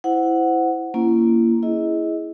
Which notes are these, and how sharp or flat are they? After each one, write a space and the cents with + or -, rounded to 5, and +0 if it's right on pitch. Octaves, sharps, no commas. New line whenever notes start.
E4 +0 C5 -15 F#5 +0
A#3 +0 C#4 +0 E4 +40
E4 +0 G#4 +5 D#5 +20